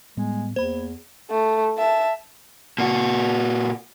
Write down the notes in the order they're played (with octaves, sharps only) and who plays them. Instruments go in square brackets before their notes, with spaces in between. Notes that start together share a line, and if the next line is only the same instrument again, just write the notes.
[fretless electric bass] A2 G3 B3 [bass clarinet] G#3
[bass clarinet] E2 [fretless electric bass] A#3 [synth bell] C5 B5
[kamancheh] A3
E5 A5
[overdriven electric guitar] A#2 F#4